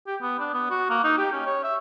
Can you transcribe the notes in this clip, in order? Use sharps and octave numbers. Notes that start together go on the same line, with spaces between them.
G4
B3
D4
B3
F#4
A#3
D#4
G4
C#4
C#5
E5